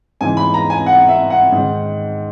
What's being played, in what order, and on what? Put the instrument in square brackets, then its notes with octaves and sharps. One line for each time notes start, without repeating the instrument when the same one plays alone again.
[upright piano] G#2 E3 G#5
B5
A#5
G#5
F#5
E5
F#5
G#2 D#3